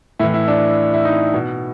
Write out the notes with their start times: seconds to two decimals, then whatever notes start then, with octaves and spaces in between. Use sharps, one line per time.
0.19 A2 E3 E4
0.34 E4
0.48 D4
0.93 E4
1.05 D#4
1.34 B2